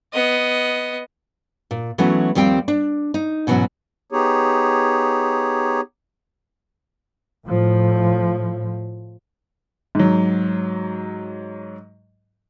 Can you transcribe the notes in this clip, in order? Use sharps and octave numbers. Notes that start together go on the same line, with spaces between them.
B3 D#5
A#2
E3 F#3 A3 B3 C#4
D#2 F3 G3 C4 G5
D4
D#4
G#2 B2 E3 F#3 C#4
B3 D#4 G4 G#4 C#5
A2 F3
G#2 F#3